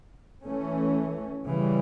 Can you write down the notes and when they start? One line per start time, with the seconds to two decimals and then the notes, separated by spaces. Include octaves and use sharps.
0.45 E3 A3 C#4
1.47 C#3 E3 G3